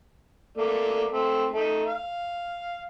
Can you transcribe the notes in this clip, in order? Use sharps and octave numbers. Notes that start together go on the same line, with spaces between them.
A3 A#3 D5
A3 C4
A3 D#4
F5